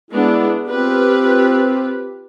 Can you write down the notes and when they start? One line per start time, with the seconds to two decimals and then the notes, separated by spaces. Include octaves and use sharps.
0.11 G#3 B3 D4 E4
0.67 C4 F4 G4 B4